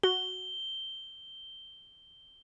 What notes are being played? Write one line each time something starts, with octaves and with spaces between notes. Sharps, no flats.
F#4 G7